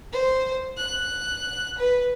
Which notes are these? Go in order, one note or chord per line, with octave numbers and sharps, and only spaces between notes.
C5
F#6
B4